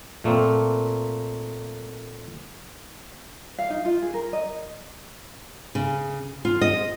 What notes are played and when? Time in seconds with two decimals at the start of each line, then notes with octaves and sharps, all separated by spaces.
0.24 A#2 A3 A#3 C4
3.59 F5
3.70 D#4
3.85 F4
4.02 G#4
4.14 A#4
4.33 D#5
5.75 C#3
6.45 F4
6.61 D#5